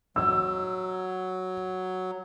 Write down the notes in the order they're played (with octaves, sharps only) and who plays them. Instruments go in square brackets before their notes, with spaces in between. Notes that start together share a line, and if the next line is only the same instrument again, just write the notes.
[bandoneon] F#3 [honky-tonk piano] E6